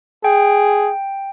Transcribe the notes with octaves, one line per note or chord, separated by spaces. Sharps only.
G#4 G5